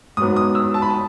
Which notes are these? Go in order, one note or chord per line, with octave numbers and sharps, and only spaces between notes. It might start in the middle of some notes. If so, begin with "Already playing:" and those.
G#2 F#3 B3 D#6
D#6
E6
A5
B5
A5